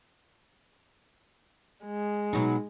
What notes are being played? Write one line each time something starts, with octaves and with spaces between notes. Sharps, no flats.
G#3
B2 F#3 D#4